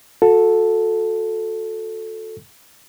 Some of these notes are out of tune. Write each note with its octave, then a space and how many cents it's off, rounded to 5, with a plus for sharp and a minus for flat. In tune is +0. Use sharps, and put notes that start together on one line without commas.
F#4 -40 A4 +0